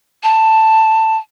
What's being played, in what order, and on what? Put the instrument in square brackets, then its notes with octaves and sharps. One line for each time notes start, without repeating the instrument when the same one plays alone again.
[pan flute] A5